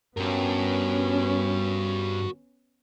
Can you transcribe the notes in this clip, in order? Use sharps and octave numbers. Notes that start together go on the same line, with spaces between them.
G2 B3 C#4 F#4 A#4